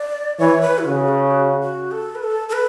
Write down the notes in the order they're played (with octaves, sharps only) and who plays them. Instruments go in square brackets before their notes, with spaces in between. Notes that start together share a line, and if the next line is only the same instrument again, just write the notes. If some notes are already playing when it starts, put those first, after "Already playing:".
Already playing: [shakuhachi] D5
[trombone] E3 [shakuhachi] C#5
[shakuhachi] B4
E4
[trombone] C#3 [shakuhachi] F#4
[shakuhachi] G#4
F#4
F#4
A4
B4
A4
A4
B4